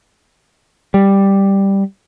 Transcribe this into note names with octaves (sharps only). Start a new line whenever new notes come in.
G3